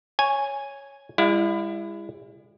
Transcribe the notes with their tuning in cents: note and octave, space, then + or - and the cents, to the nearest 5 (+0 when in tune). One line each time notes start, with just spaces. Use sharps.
C#5 +0 G#5 -5
G#3 -45 E4 +20 F#5 -40